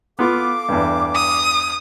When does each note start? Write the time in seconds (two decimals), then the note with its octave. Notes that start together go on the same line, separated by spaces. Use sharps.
0.19 B3 F4 A4 F5 D6
0.69 E2 G2
1.15 D#6